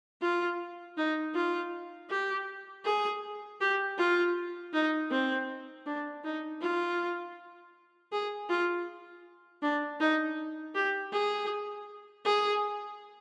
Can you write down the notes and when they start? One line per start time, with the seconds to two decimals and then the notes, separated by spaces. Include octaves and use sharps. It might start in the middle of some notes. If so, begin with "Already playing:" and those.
0.22 F4
0.97 D#4
1.35 F4
2.10 G4
2.85 G#4
3.60 G4
3.98 F4
4.73 D#4
5.11 C4
5.86 D4
6.24 D#4
6.61 F4
8.12 G#4
8.49 F4
9.62 D4
10.00 D#4
10.75 G4
11.12 G#4
12.25 G#4